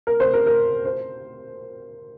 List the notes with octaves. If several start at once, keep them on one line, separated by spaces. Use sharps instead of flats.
A#4
C5
A#4
A#4
C5